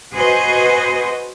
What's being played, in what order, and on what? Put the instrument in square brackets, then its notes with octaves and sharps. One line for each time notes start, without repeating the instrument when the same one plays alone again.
[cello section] F#4 G#4 B4 C5 D#5